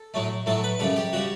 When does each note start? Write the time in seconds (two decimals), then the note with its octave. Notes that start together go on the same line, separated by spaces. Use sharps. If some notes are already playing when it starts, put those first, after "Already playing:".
Already playing: A4
0.14 A2 F#3 A3
0.46 A2 F#3 A3 A4
0.64 B4
0.79 F#2 C#3 G3 A4
0.96 G4
1.13 C#3 G3 F#4